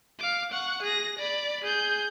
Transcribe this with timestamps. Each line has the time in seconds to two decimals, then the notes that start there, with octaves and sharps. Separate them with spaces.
0.19 F5 D6
0.52 F#5 C#6
0.82 G#4 A#6
1.19 D5 B5
1.64 G#4 G6